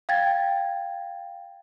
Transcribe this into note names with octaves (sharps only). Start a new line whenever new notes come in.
F5 G5 G#6 A6